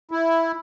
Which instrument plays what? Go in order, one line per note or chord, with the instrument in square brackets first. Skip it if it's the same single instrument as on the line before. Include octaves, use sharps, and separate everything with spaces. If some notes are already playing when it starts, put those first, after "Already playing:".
[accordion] E4